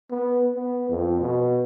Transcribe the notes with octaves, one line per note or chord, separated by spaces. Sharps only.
B3
B3
F2
B2